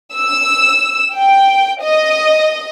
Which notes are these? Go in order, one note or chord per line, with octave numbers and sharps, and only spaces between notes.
E6
G5
D#5